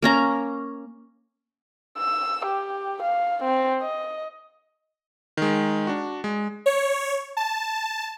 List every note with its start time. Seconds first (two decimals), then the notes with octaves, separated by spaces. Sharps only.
0.02 A#3 C#4 A#5
1.98 E6
2.46 G4
3.03 F5
3.44 C4
3.81 D#5
5.37 D#3 G#3
5.87 D4 F#4
6.24 G#3
6.66 C#5
7.37 A5